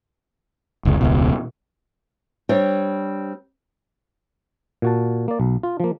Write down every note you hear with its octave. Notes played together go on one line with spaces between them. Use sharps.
F1 C#2
E1 C#2 B2
G3 C4 D4 C#5
A#2 F#4 A5
A#3 D5
B1
F4
F3 A#3